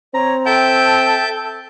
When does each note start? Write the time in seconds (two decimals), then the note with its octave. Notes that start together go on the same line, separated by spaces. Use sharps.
0.14 C4 C#5 A#5
0.46 A4 E5 G5 A5 G6